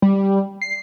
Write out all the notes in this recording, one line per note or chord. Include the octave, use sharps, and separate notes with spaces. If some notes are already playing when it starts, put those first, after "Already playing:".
G3
C7